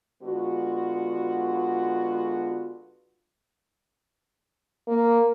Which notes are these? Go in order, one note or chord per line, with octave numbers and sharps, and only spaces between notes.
D3 G#3 B3 F4 F#4
A#3